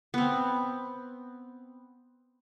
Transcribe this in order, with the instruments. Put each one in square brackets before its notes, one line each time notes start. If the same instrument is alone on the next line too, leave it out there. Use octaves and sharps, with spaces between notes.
[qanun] B3 C4